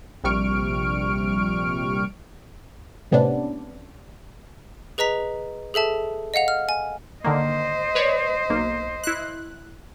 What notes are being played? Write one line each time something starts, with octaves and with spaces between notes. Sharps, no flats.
A#1 C3 G3 C#6 F6 D7
A2 C3 B3 C#4 D4
G#4 B4 D#5 A#5 B6
G#4 A4 E5 A5
D#5 F5 F#5 F7
F6
G#5
D3 D#3 A#3 C5 D#5
B4 C#5 D5
B1 A#3
E4 F#6